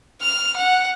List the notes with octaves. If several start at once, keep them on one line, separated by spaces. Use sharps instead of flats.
F6
F#5